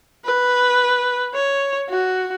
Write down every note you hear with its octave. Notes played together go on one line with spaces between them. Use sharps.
B4
C#5
F#4